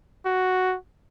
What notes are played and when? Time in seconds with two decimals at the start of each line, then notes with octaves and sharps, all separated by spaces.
0.26 F#4